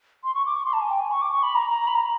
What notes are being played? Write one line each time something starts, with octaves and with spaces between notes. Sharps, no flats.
C6
C#6
D6
C#6
C6
A5
G#5
G5
G#5
C#6
D6
C#6
B5
A#5
A#5
B5
A#5